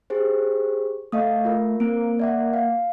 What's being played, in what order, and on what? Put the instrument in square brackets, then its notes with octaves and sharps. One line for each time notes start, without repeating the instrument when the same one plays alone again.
[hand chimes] G4 G#4 C5
[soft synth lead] A3 [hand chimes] D#5 F5 D#6
[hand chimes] F4 A#4
[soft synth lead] A#3 [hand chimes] C4 A#4 D7
[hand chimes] D5 E5 F#5
F5